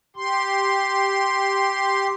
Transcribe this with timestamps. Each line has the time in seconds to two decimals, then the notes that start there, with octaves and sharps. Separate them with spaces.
0.16 G4 C6